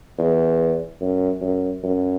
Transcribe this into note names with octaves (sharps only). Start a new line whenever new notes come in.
E2
F#2
F#2
F#2